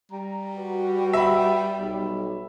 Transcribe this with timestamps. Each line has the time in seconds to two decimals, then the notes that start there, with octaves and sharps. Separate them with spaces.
0.12 G3 A#5
0.58 F#4 B4
1.13 E5 B5
1.79 B1